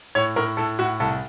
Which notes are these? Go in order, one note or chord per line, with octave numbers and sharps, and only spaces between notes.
A2 C#5
A2 A#4
A2 A4
A2 F#4
C2 A4